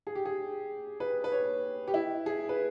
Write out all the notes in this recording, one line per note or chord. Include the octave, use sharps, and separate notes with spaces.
G#4
G4
G#4
B4
B4
C#5
G4
E4
G#4
B4